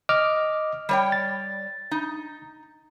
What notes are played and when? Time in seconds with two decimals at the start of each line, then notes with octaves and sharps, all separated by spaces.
0.09 D#5 D6 F6
0.89 G3 C#5 G5
1.12 A6
1.91 D#4